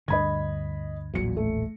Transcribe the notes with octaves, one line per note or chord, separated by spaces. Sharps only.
D2 G2 D3 D#5 B5 G#6
D#1 A1 A#2 F#3 C#7
A3